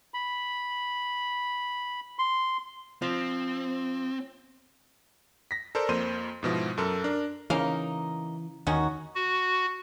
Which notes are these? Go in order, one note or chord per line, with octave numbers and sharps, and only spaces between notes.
B5
C6
F3 C4
A#6 B6
A4 A#4 C5 D5
F2 A#3 C5 D#7
G#2 B2 F3 E4
F#2 A4 A#4
D4 A#4
C#3 E3 A#3 D#4 F5
D#2 D#3 C#4 D#4 F#4
F#4